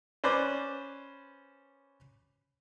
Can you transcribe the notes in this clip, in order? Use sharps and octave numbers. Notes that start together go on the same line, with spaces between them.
C#4 B4 C5 D5